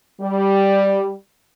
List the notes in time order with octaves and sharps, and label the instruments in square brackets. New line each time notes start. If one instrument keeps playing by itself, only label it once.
[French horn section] G3